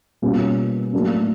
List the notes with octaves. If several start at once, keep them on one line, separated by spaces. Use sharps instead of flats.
B2 G3 A#3 C#4 F4
A2 F#3 A#3 D4